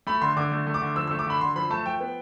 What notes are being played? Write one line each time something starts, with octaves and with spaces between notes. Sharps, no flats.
A3 B5
D3 C6
D3 D6
A3
A3
D6
D3
F3 E6
A3 E6
D6
D3 B5
D3 C6
F3 B5
A3 A5
F3 G5
B3